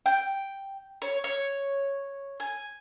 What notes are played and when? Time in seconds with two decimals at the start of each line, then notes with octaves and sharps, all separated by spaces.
0.06 G5
1.02 C#5
1.24 C#5
2.40 G#5